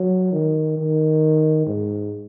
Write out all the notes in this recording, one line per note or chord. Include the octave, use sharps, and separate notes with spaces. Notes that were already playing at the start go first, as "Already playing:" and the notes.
Already playing: F#3
D#3
D#3
G#2